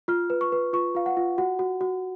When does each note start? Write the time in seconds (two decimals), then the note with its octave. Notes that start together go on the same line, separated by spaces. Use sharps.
0.08 F4 F6
0.30 B4
0.41 C#6
0.52 B4
0.73 F4 C#6
0.95 F4 F5
1.06 F#5
1.17 F4
1.38 F#4 F#5
1.59 F#4
1.81 F#4